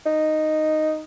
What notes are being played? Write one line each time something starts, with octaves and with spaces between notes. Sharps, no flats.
D#4